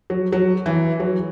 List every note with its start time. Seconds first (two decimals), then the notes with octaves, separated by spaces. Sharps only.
0.10 F#3
0.32 F#3
0.66 E3
1.00 F#3